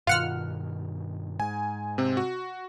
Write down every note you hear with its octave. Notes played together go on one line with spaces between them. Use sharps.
G2 B2 D#3 F4 F#5 F6
G#2 G#5
C3 C4
F#4